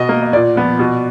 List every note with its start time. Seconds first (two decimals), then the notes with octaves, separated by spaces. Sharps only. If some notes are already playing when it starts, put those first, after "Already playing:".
Already playing: B2 D#5
0.09 A#3
0.22 D#5
0.33 A#2 D5
0.56 F3 B3
0.79 B2